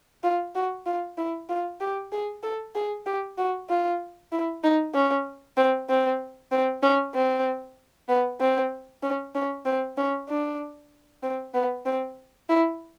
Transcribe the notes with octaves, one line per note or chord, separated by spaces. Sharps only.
F4
F#4
F4
E4
F4
G4
G#4
A4
G#4
G4
F#4
F4
E4
D#4
C#4
C4
C4
C4
C#4
C4
B3
C4
C#4
C#4
C4
C#4
D4
C4
B3
C4
E4